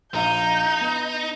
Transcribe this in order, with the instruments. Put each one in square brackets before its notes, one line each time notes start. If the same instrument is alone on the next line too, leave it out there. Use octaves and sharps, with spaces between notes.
[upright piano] A#1 F5 G7 [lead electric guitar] D#4 [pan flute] A#5 [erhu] G6
[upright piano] B3